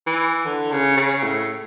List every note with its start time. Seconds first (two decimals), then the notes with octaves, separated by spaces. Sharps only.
0.07 E3
0.45 D3
0.72 C#3
0.97 C#3
1.23 A2